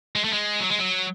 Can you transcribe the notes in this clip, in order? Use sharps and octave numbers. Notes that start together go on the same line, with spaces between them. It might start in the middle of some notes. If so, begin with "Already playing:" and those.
G#3
A3
G#3
F#3
G#3
F#3